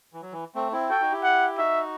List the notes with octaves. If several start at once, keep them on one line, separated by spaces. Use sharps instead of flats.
E3
F#3
E3
A3 C4
C4 E4
F#4 A4 G5
D#4 F#4
E4 G4
F#5
D#4 F#4 E5